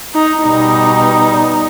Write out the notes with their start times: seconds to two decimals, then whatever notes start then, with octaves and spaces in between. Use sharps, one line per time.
0.14 D#4
0.43 B2 G3 D#4